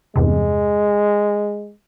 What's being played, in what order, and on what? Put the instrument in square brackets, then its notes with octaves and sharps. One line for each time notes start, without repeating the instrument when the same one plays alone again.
[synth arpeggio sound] E2 G2 C3 [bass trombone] G#3